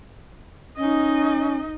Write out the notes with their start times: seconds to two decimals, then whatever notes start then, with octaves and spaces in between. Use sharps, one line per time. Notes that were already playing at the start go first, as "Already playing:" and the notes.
0.77 C#4 D#4 D#5